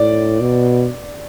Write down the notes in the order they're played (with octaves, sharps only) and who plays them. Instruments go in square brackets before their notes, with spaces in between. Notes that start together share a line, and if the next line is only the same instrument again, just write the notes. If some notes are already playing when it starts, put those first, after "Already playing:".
Already playing: [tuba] A2 [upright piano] D5
[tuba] B2